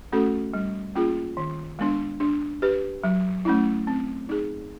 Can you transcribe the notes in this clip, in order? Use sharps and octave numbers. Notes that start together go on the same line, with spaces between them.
A3 C#4 F#4 A4
G3
A#3 C#4 F4 G#4
D#3
G#3 B3 D4
D4
G4 B4
F#3
A3 C#4 E4
C4
D#4 G#4